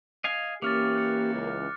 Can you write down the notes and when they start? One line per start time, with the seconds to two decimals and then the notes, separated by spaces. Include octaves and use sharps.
0.24 D#5 F5 G#5
0.62 E3 A#3 C#4 G4 D6 F6 A6
0.96 F#6 C#7
1.34 C#2